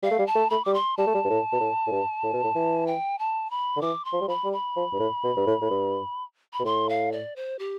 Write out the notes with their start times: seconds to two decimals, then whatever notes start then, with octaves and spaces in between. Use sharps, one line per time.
0.03 G3 F5
0.11 A3
0.19 G3
0.27 A5
0.35 A3
0.50 A3 B5
0.65 G3 D6
0.74 C6
0.97 G3 A5
1.07 A3
1.15 G3
1.25 G2
1.30 A2
1.53 B2
1.60 A2
1.87 A2
1.92 G2
2.24 A2
2.33 B2
2.44 A2
2.55 E3
2.87 G5
3.19 A5
3.50 B5
3.77 D3
3.81 E3 D6
4.05 C6
4.13 F3
4.21 G3
4.28 F3 B5
4.45 G3
4.53 B5
4.77 F3
4.93 G2
5.00 A2
5.24 B2
5.37 G2
5.47 A2
5.62 A2
5.71 G2
6.53 B5
6.59 B2
6.65 A2 C6
6.89 F5
7.12 D5
7.36 C5
7.59 G4